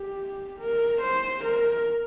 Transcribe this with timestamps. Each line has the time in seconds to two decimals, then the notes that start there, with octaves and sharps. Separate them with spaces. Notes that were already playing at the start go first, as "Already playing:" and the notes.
Already playing: G4
0.60 A#4
1.02 C5
1.45 A#4